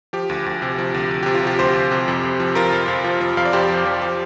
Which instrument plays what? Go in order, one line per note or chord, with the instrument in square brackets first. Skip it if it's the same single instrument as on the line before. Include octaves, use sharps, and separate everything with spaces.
[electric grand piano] F3 G4
D2
D2
C3
F3
D2
D2
C3 G4
F4
F3 G4
D2 G4 C5
D2
C3
F2
F2
F3
F3 F4 A#4
F2
F2
F3
F3
F2 F5
D5
F2 G4 C5
F3
F3
F3